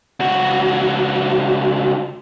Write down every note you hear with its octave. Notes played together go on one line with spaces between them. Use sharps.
C#2 F#4